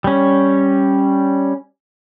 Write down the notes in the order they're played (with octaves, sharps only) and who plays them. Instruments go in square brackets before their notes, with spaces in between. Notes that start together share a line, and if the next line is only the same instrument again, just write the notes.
[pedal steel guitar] G3 C#4